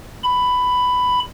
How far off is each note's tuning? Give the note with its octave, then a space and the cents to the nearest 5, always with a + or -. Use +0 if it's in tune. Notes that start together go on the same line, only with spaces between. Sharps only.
B5 +10